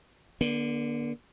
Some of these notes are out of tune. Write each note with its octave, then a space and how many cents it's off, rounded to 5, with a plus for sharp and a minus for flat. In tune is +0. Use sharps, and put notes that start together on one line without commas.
D3 +0 A#3 +45